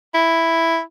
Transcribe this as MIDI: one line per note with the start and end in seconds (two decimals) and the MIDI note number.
0.14 0.80 64